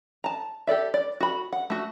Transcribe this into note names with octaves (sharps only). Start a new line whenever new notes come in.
A5 A#5
G4 A4 D5 E5
D5
F#4 B5
F#5
A3 F#4